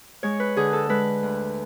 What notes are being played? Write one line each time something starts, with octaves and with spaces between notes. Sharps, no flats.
G#3 C#5
B4
D3 G#4
A4
G#3 B4
D2